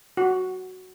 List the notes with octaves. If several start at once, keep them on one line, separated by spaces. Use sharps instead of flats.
F#4